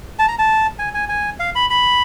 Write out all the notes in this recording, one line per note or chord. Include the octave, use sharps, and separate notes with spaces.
A5
A#5
A5
G#5
G#5
G#5
F5
B5
B5